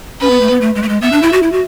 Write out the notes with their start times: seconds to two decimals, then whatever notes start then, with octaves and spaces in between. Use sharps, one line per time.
0.20 C#4 B4
0.30 B3
0.41 A3
0.50 B3
0.61 A3
0.75 G#3
0.82 A3
0.89 G#3
1.02 B3 E5
1.12 D4
1.23 E4
1.33 F#4
1.43 E4
1.52 F#4